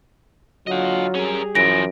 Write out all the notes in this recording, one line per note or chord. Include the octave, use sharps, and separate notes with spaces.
D3 F#3 F4 D#5 F#5
G3 C#4 G4 G#4 A#4
F#2 E3 F3 A#6 D7